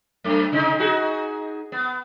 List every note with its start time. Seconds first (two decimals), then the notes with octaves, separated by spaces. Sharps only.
0.24 F#2 A3
0.52 C3 D#4
0.79 D#4 F#4 G#4
1.72 B3